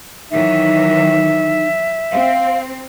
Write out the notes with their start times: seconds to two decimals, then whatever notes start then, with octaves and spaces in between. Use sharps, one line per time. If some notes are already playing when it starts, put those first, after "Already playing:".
0.31 D#3 E3 F#3 D#4 E5
2.12 C4 F5